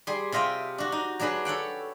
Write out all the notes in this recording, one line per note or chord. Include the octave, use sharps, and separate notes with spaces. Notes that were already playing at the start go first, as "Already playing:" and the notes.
G3 G#4 C6
C3 F4 D#5 E5 G5
D4 F#4
D#4
F#3 D4 G#4 B4 B5
A4 C#5 F#5 G5